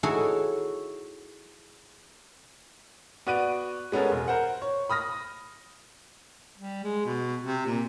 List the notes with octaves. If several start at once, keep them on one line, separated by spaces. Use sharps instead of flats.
D#4 E4 F#4 G#4 A4 C#5
B3 F#4 D5 F#6 D7 D#7
G#3 B3 C#4 A4 A#4
E1
A#4 C5 F#5
C#5
B5 D#6 F6 A#6
G3
G#3
B2
C3
A#2